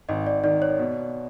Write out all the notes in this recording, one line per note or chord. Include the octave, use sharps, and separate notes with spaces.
G#1 D#5
D5
D#3 D5
C#5
B2